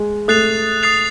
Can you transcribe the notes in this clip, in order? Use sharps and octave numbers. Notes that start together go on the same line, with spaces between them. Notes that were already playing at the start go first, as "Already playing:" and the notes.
Already playing: G#3
A3 D#6 F#6 A6 C7 F7
D#6 F#6 A6 C7 F7